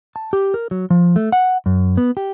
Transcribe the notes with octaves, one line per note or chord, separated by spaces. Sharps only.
A5
G4
A#4
F#3
F3
A3
F#5
F#2
B3
G4